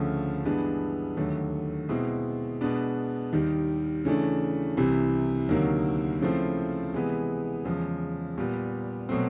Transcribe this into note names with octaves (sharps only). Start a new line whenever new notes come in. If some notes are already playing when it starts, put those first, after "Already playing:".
Already playing: D2 C#3 F3 A3
G2 E3 G#3 B3 D4
D#2 D3 F#3 A3
B2 G#3 C4 E4
B2 G#3 B3 D4
D#2 D#3 G3
C#3 E3 A3 D4
C2 C3 E3
D2 C3 D#3 F#3 A#3
C#3 F3 A3 C4 E4
C3 E3 G#3 B3
E2 C#3 F3 G#3
A#2 G3 B3
B2 F#3 A3 C4